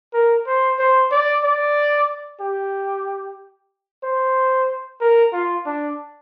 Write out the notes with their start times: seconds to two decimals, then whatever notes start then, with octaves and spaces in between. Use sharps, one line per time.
0.14 A#4
0.47 C5
0.79 C5
1.11 D5
1.44 D5
2.41 G4
4.04 C5
5.01 A#4
5.33 F4
5.66 D4